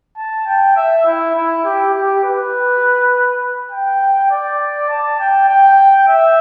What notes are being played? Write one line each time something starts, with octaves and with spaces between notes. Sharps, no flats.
A5
G5
E5
E4
E4
G4
G4
B4
G5
D5
A5
G5
G5
E5